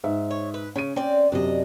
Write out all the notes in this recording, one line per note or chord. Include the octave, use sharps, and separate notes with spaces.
G#2 E5
C#5
B4
C#3 C#4 D#7
C4 C#4 D5
F#2 C3 D4 D#5